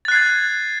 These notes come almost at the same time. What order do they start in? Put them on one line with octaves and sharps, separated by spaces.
A6 F#6 C7 G#6